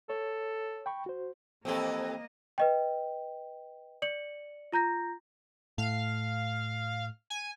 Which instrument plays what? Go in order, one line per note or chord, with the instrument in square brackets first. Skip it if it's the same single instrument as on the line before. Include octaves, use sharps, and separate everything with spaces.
[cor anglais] A4 [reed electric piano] C#5
[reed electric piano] G5 B5 C#6
F#4 C5
[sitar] F2 E3 G4 [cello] A#3 D#5 [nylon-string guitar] C4 [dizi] A4
[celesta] B4 D#5 G5
D5 C#7 F#7
F4 A#5 G6 A#6
[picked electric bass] A2 [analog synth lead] F5
[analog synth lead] G#5